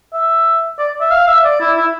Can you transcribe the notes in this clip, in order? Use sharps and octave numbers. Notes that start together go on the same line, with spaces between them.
E5
D5
E5
F5
E5
D5
E4
E4